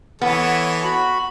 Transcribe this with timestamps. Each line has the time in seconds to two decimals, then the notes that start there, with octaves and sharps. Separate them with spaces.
0.22 E3 B3 A4 C#5
0.84 F#4 B5